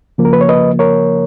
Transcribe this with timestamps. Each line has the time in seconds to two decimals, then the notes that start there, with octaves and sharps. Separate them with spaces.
0.18 C#3 F3 A#3
0.25 A#4
0.33 B4
0.41 C#5
0.49 B4 D#5
0.79 A#4 C#5